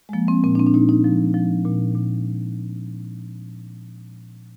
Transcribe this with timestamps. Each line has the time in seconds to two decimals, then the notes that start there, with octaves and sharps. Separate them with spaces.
0.09 G#3
0.13 F3 A#3
0.28 C4
0.44 A#2 C4
0.55 D4
0.59 C4
0.67 D4
0.74 A#2 D#4
0.89 D#4
1.04 F3
1.34 F3
1.65 A#2
1.95 A#2